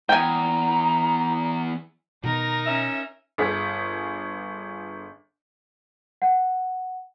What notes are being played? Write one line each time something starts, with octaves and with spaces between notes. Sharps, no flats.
E2 G5 G#5 A#5
B2 D#3 D#4 A#4
C#4 E5
G1 G#4 B6
F#5